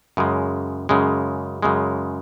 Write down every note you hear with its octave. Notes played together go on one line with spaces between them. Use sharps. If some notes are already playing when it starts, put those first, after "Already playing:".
F#2 C#3 G#3
F#2 C#3 G#3
F#2 C#3 G#3